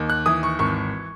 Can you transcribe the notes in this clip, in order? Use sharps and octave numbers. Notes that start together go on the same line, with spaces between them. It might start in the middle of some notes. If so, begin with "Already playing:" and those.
Already playing: D#2 D#3
F#6
E3 D#6
C#6
G#1 C#6